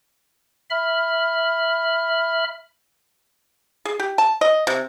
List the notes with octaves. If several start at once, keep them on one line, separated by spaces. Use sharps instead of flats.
E5 B5 F6
G#4
G4
A5
D#5
C3